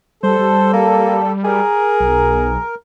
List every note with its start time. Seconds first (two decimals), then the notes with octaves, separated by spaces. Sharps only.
0.23 G3 A4 C5
0.39 G3
0.73 A#3
1.44 G#4 A#4
2.00 B1